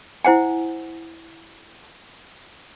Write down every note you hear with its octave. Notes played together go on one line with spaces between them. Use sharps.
E4 C5 F#5 G#5